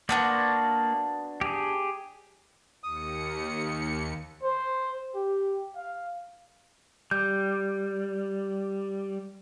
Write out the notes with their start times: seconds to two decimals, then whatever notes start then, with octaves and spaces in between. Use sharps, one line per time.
0.09 A#3 B3 D4 F#4 C5 D5
1.41 G4 G#4
2.84 D#2 D#6 C#7
4.43 C5
5.15 G4
5.75 F5
7.11 G3 G6